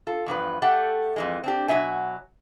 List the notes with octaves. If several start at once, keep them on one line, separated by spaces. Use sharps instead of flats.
F4 A4
E2 G2 F3 B4
A3 G4 A4 F#5 G5
F2 E3 G#3
C4 D4 G4
B2 F#3 C4 E5 G#5